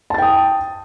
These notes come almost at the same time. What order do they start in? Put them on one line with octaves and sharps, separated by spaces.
A5 A6 G5 D#6